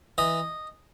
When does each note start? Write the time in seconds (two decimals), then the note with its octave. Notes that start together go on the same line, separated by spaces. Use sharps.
0.18 E3 D#5